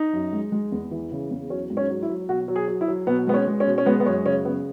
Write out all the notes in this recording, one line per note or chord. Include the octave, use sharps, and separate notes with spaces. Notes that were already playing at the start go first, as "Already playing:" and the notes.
Already playing: D#4
F#2
G#3
G#3
E2
E3
C#3
E2
F#3 C#4
G#2
C#4
F#3
E4
F#3
B2 F#4
F#3
G#4
F#3
E4
F#3
B2 B3
G#3 B3
C#4
G#3
C#4
B2
C#4
G#3 B3
B3
F#2 C#4
C#3 C#4
C#3 B3